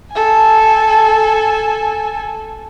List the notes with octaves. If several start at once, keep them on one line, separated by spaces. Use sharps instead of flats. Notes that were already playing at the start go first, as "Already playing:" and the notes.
A4 G#5